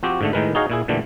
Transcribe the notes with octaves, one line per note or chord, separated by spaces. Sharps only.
F3 C4 F#4 G4
G#2 D3 A3
A2 D#3 G#3 A#4 B4
D#4 F#4 G#4 C#5 D#5 F5
A#2 E4 G#4
A#2 D3 E3 G3 A3